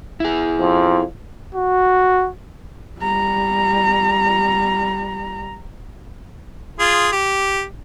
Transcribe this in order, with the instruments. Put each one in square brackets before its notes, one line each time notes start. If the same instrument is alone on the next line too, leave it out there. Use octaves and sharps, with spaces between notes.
[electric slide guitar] E4 G#4
[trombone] F2
[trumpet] F#4
[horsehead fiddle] G3 A#5
[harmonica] F4 G#4
G4